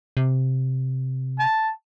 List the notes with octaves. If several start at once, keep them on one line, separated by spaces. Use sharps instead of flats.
C3
A5